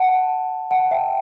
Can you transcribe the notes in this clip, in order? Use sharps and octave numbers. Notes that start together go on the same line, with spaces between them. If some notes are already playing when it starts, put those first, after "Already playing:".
Already playing: F#5 A5
F#5 A5
E5 G5